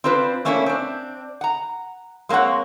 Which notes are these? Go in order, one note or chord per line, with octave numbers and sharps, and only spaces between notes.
C4 D4 F4 B4 C5
A3 A#3 C#4 D4 E4 A4
C4 D4
F#5 A#5
G#3 A#3 C4 C#5 F#5